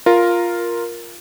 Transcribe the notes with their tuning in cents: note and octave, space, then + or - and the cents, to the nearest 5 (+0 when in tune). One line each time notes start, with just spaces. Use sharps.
F4 +0 A#4 +0